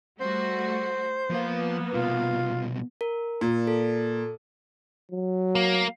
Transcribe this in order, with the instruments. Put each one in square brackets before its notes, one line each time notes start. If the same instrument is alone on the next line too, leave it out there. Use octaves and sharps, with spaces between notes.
[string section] G3 A3 F#4 [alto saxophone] C5
[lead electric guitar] F3 F5 [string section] A#3 B3
[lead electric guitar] C2 B2 [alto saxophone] F4
[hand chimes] A#4
[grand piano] A#2
[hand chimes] A4
[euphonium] F#3
[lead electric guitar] A#3